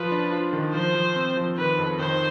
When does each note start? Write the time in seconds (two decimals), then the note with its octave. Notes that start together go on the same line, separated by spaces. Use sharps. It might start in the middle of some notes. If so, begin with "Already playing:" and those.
Already playing: F3 F4 B4
0.12 D4
0.32 F4
0.53 D#3
0.74 F3 C5
0.95 F3
1.16 C4
1.37 F3
1.58 D#3 B4
1.78 F2
1.99 D#3 C5